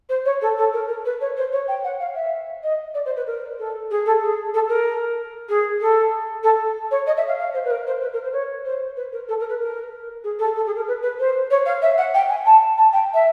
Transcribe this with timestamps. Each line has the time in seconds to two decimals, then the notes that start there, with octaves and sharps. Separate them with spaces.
0.09 C5
0.25 C#5
0.41 A4
0.57 A4
0.73 A#4
0.88 A#4
1.05 B4
1.20 C#5
1.36 C5
1.52 C#5
1.67 G5
1.83 F#5
1.99 F5
2.15 E5
2.63 D#5
2.94 D5
3.05 C5
3.16 B4
3.26 A#4
3.58 A4
3.90 G#4
4.05 A4
4.21 G#4
4.53 A4
4.68 A#4
5.48 G#4
5.80 A4
6.43 A4
6.90 C#5
7.06 D#5
7.16 E5
7.27 F5
7.38 F5
7.53 C5
7.64 B4
7.70 A#4
7.86 C5
8.01 B4
8.13 A#4
8.23 C5
8.32 C#5
8.64 C5
8.96 B4
9.12 A#4
9.28 A4
9.39 A#4
9.49 B4
9.59 A#4
10.23 G#4
10.38 A4
10.56 A4
10.66 G#4
10.75 A#4
10.87 B4
11.02 B4
11.19 C5
11.50 C#5
11.65 F5
11.81 E5
11.97 F#5
12.14 G5
12.29 G#5
12.45 A5
12.77 A5
12.92 G5
13.13 E5